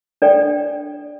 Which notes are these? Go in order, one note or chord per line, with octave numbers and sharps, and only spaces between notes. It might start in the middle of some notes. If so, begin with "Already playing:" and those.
D4 A4 D5 G5